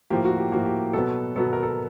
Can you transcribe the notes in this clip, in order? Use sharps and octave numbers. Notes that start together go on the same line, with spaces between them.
A2 F3 A#3 G4
F#4
G4
A2 F3 A#3 F#4
G4
B2 F#3 B3 A4
B2 F#3 B3 A4
A#4
A4